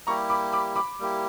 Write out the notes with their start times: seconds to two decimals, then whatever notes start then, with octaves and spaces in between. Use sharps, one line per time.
0.07 G3 A#3 E4 G4 A#5 C#6
0.30 B5 D6
0.52 B5 D6
0.75 B5 D6
0.99 G3 A#3 E4 G4